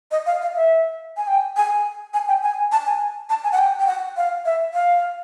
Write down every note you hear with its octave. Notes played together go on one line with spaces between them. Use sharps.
D#5
F5
F5
E5
G#5
G5
G#5
G#5
G5
G#5
A5
G#5
A5
G#5
F#5
G5
G5
F#5
F5
E5
F5